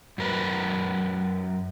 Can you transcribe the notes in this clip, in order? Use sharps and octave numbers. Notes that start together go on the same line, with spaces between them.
F#2 A#4 B4